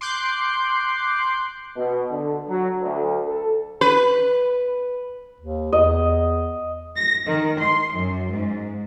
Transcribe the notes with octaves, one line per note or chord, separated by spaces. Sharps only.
C6 D6 F#6 G6 C7
B2
D3
F#3
D2
A4
B4
D#2
E2 D#5
A#6
D#3
C6
F#2
G#2